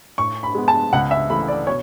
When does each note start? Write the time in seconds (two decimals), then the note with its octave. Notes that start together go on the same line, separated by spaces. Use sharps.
0.18 A2 C#6
0.43 B5
0.55 G#3 B3
0.68 A5
0.93 C#2 F#5
1.11 E5
1.30 C#3 E3 A3 B5
1.48 D5
1.67 B2 C#5